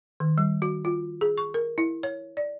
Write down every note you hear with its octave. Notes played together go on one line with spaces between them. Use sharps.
D#3
G3
F#4
F4
G#4
C#6
A#4
E4
C#5
D5